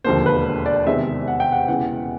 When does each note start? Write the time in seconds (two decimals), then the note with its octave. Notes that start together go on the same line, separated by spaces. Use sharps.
0.04 E1 D#2 D3 F3 A#3 C5
0.26 B4
0.66 D5
0.87 E2 C3 D#3 G#3 C4 E5
1.27 F#5
1.40 G5
1.52 F#5
1.68 E1 E2 C#3 E3 F#5